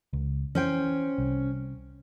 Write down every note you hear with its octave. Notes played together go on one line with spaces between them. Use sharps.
C#2
E3 C#4 C5 G5
C2